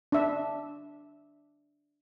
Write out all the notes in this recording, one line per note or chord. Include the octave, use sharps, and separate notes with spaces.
D4 E5